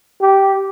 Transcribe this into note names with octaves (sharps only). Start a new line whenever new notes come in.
G4